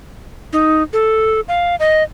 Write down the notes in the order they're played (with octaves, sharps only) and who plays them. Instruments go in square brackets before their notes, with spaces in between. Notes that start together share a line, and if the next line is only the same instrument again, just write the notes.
[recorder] D#4
A4
F5
D#5